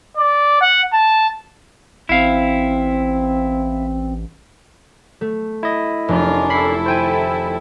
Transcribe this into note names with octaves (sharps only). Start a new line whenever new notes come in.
D5
F#5
A5
A1 C4 E4 F5
A3
E4 D#5
F1 C#4 D4 F4 A#4
E4 A4 B5 C7
C3 D#3 C5 G5 G#5